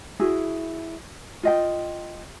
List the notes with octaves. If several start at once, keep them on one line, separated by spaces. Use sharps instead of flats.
E4 F#4 G#4
F4 D#5 G5